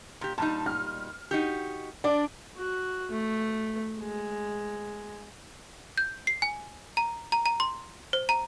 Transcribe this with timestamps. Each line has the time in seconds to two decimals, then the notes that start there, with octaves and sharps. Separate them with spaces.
0.21 A#2 G4
0.38 A#2 G3 D#4 A5
0.66 F6
1.31 D#4 F#4 G4
2.04 D4 D5
2.56 F#4
3.11 A3
4.00 G#3
5.97 G6
6.27 C7
6.42 G#5
6.97 A#5
7.32 A#5
7.46 A#5
7.60 C6
8.13 C5
8.29 A#5